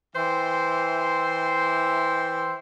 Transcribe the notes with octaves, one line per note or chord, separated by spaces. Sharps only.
E3 C5 E5 G5 C6